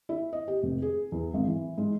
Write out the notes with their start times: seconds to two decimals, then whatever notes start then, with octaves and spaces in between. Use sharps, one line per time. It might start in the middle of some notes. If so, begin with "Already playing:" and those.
0.09 E4
0.33 D#5
0.48 G4
0.63 F1
0.82 G#4
1.12 E2
1.34 G#1
1.47 E3
1.78 G#2